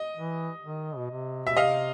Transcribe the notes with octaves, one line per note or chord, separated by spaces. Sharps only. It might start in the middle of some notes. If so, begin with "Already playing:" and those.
Already playing: D#5
E3
D#3
B2
C3
B2 E5
C3 D#5 F5